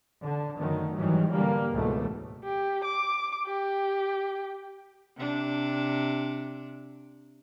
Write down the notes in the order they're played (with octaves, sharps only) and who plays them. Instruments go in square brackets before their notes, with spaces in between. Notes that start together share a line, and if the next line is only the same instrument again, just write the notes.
[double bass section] D3
F#2 D3 D#3 F#3 A3
G#2 D#3 E3 F#3 G3
D3 G3 A#3
C#2 G#2 B2 E3 A3
[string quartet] G4
D6
G4
[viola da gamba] C3 D4